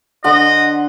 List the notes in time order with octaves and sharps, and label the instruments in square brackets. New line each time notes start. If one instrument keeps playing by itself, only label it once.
[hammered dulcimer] D3 C5 F#5 [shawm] D#5